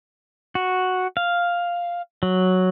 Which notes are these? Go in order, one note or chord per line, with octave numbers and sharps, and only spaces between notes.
F#4
F5
F#3